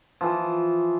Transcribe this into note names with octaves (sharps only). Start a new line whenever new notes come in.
E3 F3